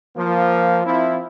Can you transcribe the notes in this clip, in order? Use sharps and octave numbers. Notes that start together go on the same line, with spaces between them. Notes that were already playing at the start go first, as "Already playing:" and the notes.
F3 A#3
F3 C4 E4